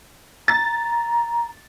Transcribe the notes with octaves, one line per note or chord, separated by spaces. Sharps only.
A#5 A6